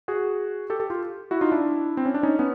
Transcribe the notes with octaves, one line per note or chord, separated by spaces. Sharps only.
F#4 G#4
G4 A4
G4 A4
F4 G4
E4 F#4
D#4 F4
D4 E4
C4
C#4
D4
C#4 D#4
B3 C#4